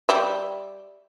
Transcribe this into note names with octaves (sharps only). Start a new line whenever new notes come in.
G3 E5